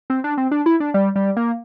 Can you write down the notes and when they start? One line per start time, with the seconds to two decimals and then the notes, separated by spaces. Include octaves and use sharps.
0.10 C4
0.24 D4
0.37 C4
0.51 D4
0.66 E4
0.80 D4
0.94 G3
1.16 G3
1.37 A#3